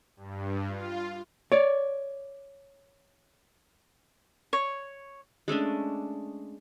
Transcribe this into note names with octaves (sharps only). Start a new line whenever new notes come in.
G2
F4
C#5 D5
C#5
G#3 A3 C#4 D4